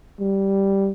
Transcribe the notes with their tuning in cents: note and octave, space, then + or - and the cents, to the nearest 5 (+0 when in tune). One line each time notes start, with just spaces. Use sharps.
G3 -5